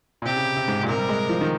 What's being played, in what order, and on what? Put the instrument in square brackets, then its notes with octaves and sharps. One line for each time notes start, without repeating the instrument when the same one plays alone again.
[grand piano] A#2
[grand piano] C3 [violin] G4
[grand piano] C#3
C3
G#2
A#2
[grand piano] C3 [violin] A#4
[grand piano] G3
G#3
F3
D#3